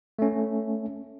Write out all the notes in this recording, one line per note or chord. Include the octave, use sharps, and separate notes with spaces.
A3 C#4